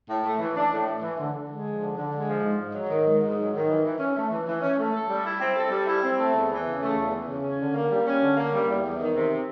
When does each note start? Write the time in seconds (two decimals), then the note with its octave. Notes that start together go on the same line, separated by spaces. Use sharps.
0.09 A2
0.24 A3
0.39 E3
0.56 D4
0.71 A2
0.86 A3
1.02 E3
1.18 D3
1.34 D3
1.49 G#3
1.65 F3
1.80 D3
1.96 D3
2.12 G#3
2.28 F3
2.43 G#2
2.59 G#2
2.75 F#3
2.90 D#3
3.05 G#2
3.21 G#2
3.37 F#3
3.52 D#3
3.68 E3
3.84 E3
3.99 C#4
4.15 A3
4.30 E3
4.46 E3
4.61 C#4
4.78 A3
4.92 A4
5.08 G3
5.23 E4
5.40 C4
5.55 A4
5.70 G3
5.86 E4
6.02 C4
6.18 A3
6.34 E2
6.49 E3
6.65 C#3
6.81 A3
6.96 E2
7.11 E3
7.27 C#3
7.43 C#4
7.59 D3
7.74 A#3
7.89 G3
8.05 C#4
8.21 D3
8.37 A#3
8.52 G3
8.68 E2
8.83 E2
8.99 D#3
9.15 C3